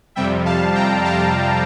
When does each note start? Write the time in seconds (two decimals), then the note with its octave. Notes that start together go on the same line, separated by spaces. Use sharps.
0.15 F2 C3 G3 E5 G5
0.45 F5 A5
0.75 G5 A#5
1.05 F5 A5